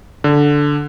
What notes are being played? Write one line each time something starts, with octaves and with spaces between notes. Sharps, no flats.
D3